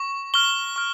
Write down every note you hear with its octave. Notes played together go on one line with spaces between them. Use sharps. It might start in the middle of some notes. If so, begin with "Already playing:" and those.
Already playing: C#6
C#6 F6 G7
C#6 F6